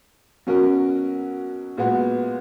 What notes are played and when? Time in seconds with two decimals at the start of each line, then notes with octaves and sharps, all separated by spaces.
0.47 B2 F#3 C#4 F#4 A#4
1.77 A#2 G#3 B3 F#4